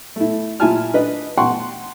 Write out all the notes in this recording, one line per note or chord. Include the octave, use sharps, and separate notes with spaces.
A3 E4
A#2 E4 F4 G#5 A5 F6
D4 B4 D#5
F#5 G5 A5 C6 C#6